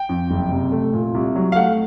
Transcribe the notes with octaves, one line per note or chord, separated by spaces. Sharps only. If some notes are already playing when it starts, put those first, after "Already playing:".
Already playing: G5
F2
F#1
C3
A3
A#2
C2
F#3
F5
A3 F#5